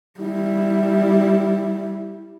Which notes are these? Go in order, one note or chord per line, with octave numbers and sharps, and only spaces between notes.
G3 E4